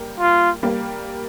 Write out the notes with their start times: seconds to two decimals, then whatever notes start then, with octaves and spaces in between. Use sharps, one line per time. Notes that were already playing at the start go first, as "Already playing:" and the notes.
Already playing: G3 A#3
0.20 F4
0.63 G3 A#3